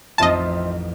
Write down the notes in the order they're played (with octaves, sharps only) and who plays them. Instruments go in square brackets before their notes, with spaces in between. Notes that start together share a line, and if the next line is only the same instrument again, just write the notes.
[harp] A1 F2 D#4 [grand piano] C4 F4 E5 [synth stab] D#5 A5